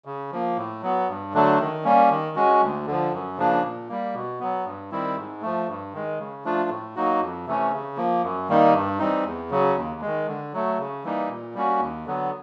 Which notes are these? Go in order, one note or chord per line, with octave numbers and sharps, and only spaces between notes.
C#3
F3 A#3
A2
F#3 B3
G2
D3 F#3 A3 D4
D#3
G3 A#3 C#4
D#3
G#3 C#4 F#4
D2
D3 F3
F#2
C#3 F3 A#3 D4
A#2
G3 A#3
B2
F#3 B3
G2
D#3 G3 C4 E4
G#2
F3 A3
G2
D#3 G#3
C#3
F3 A3 D4 F4
A2
F#3 A#3 D#4 F#4
F2
C3 E3 A3 C#4
C#3
F3 A#3
F#2
D#3 G3 A#3 D#4
G2
E3 G3 C4 D#4
E2
C#3 F#3
D#2
D#3 G#3
D3
F#3 A3
C#3
E3 G3 A#3 D#4
A#2
G3 A#3 C#4 F#4
D#2
D3 F#3 B3